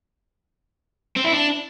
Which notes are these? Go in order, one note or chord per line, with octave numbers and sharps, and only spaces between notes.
C4
E4
D4